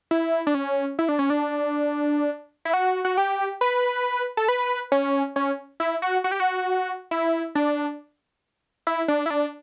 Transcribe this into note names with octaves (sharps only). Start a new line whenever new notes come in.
E4
D4
C#4
E4
D4
C#4
D4
E4
F#4
F#4
G4
B4
A4
B4
C#4
C#4
E4
F#4
F#4
G4
F#4
E4
D4
E4
D4
E4
D4